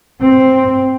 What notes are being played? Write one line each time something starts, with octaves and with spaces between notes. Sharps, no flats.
C4